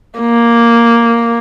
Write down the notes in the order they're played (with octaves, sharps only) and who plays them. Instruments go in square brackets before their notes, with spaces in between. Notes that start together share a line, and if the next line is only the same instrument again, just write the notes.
[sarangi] A#3